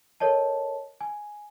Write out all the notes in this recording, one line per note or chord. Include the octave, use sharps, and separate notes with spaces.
A4 A#4 C#5 D#5 A5
G#5